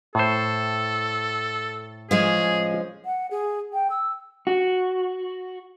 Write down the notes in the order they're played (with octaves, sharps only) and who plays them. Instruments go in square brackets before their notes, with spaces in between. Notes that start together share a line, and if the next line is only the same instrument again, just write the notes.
[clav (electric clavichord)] A2 C5 [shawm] A4
[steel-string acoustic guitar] F3 G#3 C#4 [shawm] G#4
[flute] F#5
G#4
G5
E6
[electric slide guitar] F#4